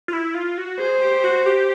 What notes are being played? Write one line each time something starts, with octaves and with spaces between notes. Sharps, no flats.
F4
E4
F4
F#4
G#4 C5
G4
F#4
G4